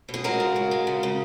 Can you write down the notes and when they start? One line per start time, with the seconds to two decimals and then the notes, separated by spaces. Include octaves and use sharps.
0.09 B2
0.14 G#4
0.24 G#3 F#4 A#4
0.40 C#3
0.56 C#3
0.71 G#3
0.87 C#3
1.03 C#3